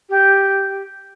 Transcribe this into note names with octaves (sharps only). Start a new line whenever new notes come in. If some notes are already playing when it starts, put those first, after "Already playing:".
G4